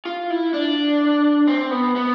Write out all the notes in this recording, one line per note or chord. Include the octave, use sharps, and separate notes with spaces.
F4
E4
D4
C4
B3
B3